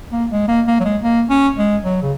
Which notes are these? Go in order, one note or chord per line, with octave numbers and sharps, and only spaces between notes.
A#3
G#3
A#3
A#3
F#3
G#3
A#3
C#4
G#3
F#3
C#3